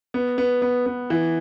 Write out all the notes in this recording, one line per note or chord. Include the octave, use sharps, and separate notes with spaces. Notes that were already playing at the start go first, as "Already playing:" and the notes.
B3
B3
B3
B3
E3